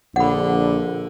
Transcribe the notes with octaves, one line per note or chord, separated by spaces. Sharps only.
A#1 D3 F#5 B5